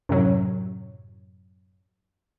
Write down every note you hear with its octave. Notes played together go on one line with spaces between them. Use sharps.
F#2 A2 C3 F#3